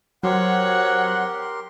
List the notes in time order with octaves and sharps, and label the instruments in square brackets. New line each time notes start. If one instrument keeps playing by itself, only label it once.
[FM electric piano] F#3 [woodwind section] C4 F#4 F#5 [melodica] G4 A#4 C6 [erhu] C#5